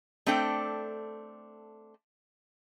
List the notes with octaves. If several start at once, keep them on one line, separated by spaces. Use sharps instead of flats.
A3 C4 D4 A4 G5